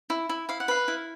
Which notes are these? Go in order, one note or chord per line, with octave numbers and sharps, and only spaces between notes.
E4
E4
E4 F5
F#5
B4 F5
E4